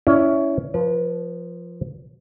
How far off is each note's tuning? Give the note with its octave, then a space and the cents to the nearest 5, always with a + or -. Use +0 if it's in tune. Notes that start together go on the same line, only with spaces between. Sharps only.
C#4 +15 E4 +0 D5 +0
F3 +0 B4 -40